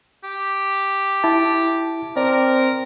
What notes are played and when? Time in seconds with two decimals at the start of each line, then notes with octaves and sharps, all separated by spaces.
0.24 G4
1.24 E4 A5
2.17 C4 A#4 D5